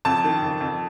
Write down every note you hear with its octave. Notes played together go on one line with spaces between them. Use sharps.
F2 A5
D#3
F2
F2